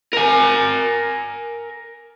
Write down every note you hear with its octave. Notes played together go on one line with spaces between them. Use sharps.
A#4 G#5